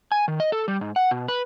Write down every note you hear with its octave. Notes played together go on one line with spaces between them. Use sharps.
G#5
D#3
D#5
A4
G3
G#2
F#5
B2
B4